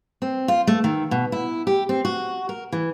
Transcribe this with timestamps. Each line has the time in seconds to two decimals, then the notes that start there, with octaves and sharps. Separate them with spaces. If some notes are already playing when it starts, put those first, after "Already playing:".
0.22 C4
0.48 F4
0.67 A3
0.84 D#3
1.11 B2
1.32 E4
1.67 G4
1.89 C4
2.05 F#4
2.49 A#4
2.72 E3